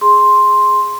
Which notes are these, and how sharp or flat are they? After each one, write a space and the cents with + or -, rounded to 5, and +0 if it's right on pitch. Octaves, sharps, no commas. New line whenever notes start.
G#4 +0 C6 +5